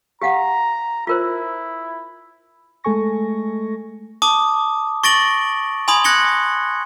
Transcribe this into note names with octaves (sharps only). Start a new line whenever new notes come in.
G4 F5 F#5 A#5
E4 F4 A#4 C5
G#3 A3 A4 G#5 C#6 A#6
A5 D6 D#6
C#6 A6 A#6 D7 F#7 G7
G#5 B5 C6 D#6 G#6
F#6 G#6 A#6 C#7 F#7 G7